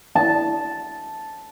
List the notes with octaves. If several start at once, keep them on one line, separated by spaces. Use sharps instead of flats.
A5